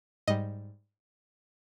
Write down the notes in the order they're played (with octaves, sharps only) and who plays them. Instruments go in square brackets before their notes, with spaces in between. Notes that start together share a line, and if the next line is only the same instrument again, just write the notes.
[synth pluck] G#2 G3 D#5